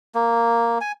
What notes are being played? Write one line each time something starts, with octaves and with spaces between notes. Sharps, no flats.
A#3
G#5